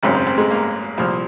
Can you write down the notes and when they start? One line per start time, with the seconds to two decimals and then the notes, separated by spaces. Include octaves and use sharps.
0.03 G#1 F#2 C#3 C4
0.15 C4
0.27 C4
0.38 G#3
0.51 A#3
0.98 C2 A#2 F3